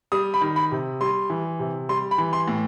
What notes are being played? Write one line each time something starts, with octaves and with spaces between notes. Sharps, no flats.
G3 D#6
B5
D#3
B5
C3
G3 C6
E3
C3
G3 C6
B5
E3
C6
A2